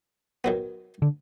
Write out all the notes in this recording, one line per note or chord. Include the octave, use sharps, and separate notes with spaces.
D#3 F#3 B3
D3